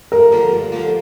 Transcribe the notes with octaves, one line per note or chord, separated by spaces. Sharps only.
G2 A#4
D3 F3 A#3
G2
D3 F3 A#3